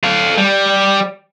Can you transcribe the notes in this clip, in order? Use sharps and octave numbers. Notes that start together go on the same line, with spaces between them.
A4 F5
G3